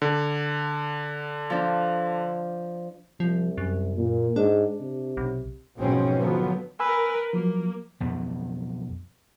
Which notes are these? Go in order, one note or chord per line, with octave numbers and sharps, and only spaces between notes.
D3
F3 D4
C2 F3
F#2
A#2
G#2 D4
C3
B1
B1 G#2 B2 F3 C4 C#4
D3 F3 F#3 B3
A#4 B4 G#5 B5 E6
F3 F#3 A#3
B1 F2 B3